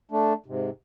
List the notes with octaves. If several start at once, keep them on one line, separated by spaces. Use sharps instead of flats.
A3 D4
G#2 C3